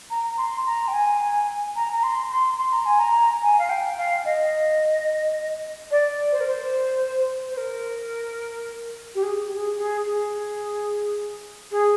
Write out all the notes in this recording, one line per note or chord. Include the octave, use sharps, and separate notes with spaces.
A#5
C6
A#5
G5
G#5
A#5
A#5
C6
C6
C6
A#5
G#5
A#5
G#5
F5
G5
F5
D#5
D5
C5
A#4
C5
C5
A#4
G4
G#4
G#4
G#4
G#4
G#4